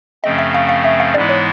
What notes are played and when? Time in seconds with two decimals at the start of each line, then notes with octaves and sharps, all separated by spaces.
0.24 F#2 C#3 F3 A3 C4 D#5
0.39 E5
0.54 F5
0.69 F5
0.84 E5
1.00 F5
1.14 G#2 E3 G#3 B3 E4 D5
1.29 C#5